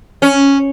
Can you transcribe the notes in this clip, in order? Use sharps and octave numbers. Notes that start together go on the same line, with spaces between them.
C#4